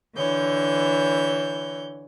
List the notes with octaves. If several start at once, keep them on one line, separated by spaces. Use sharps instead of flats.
D3 E3 C#5 G6